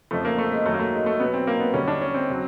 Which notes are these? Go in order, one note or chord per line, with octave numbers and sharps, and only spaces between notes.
F2 C#3 F3 A3
A#3
A3
G#3
F#2 D#3 F#3 A3
A#3
A3
G#3
A3
B2 F#3 B3
C4
A#3
B3
F#2 D3 G3 C#4
D4
C#4
C4
C#3 F#3